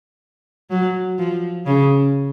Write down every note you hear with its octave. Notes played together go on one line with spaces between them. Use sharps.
F#3
F3
C#3